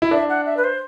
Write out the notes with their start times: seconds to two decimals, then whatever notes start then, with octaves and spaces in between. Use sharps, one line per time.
0.02 E4
0.11 D4 E5
0.29 F#5
0.46 E5
0.57 B4
0.64 C5